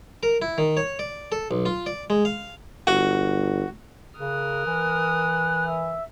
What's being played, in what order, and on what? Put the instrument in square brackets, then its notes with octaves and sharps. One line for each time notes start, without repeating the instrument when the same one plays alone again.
[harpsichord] A#4
E4
D#3
C#5
D5
A4
B1
F4
D5
G#3
F5
[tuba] G1 [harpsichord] F#4
[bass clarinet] C#3 [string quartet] A#4 D#6 F6 [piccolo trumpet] F#6
[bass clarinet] E3
[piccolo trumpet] E5